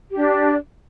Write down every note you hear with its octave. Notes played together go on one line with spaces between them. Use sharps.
D4 G4 D5